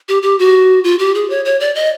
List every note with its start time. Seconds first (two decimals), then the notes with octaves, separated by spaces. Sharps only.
0.09 G4
0.23 G4
0.39 F#4
0.84 F4
0.99 G4
1.15 G#4
1.30 C#5
1.45 C#5
1.60 D5
1.75 D#5